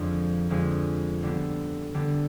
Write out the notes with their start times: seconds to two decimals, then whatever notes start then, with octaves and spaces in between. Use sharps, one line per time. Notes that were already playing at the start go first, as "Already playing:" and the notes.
Already playing: F2 D3 F3 G#3
0.50 F2 D3 F3 G#3
1.22 D3 G3 B3
1.94 D3 G3 B3